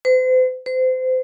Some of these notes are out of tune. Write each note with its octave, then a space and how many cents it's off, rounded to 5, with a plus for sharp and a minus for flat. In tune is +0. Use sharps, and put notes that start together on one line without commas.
C5 -40
C5 -30